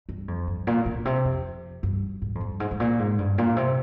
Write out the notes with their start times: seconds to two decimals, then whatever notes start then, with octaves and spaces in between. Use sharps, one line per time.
0.09 G2
0.28 F2
0.48 G2
0.67 A#2
0.86 A#2
1.05 C3
1.25 F2
1.83 G2
2.22 G#2
2.35 F2
2.41 G2
2.60 G#2
2.71 G#2
2.80 A#2
2.99 G#2
3.19 G2
3.38 A#2
3.56 C3